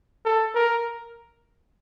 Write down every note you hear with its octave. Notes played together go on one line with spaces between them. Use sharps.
A4
A#4